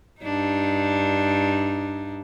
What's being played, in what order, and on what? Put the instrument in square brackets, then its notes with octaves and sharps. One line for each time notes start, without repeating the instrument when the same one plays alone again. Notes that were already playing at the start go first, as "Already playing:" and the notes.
[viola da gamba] G2 D4 D#4